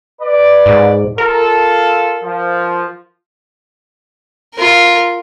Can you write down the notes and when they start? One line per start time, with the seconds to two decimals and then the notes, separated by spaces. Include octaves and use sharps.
0.22 B4 D5
0.66 G#2
1.18 F4 A4 A#4
2.23 F3
4.54 F4 A#4